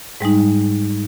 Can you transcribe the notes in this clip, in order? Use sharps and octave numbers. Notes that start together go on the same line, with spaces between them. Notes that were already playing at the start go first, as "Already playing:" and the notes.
G#2 G3 G#3 D#4